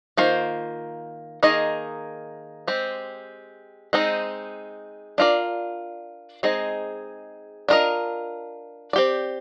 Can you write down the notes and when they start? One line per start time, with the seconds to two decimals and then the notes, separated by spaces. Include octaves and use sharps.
0.17 D#3 A#3 F4 C5
1.43 D#3 A#3 D#4 G#4 D#5
2.68 G#3 C4 G4
3.93 G#3 C4 D#4
5.18 D4 F4 A#4 D5
6.43 G#3 C4 D#4 G#4 D#5
7.69 D4 F4 A#4 D#5
8.93 C4 G4 D5